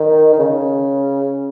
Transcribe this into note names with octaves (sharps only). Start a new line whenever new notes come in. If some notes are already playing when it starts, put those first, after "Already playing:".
Already playing: D#3
D#3
C#3